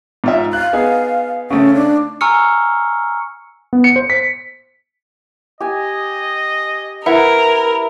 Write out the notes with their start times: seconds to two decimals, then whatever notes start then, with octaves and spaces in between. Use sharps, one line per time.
0.24 G#2 F4 E5
0.53 F5 F#6
0.73 B3 D#4 G#4
1.50 C#3 A3 C4 C#4
1.75 D4
2.21 G#5 A#5 C#6 E6 F6 C#7
3.73 B3
3.84 C#7
3.96 C5
4.10 B6
5.61 G4 D#5 G#5
7.06 E4 A#4 B4 E5 F#5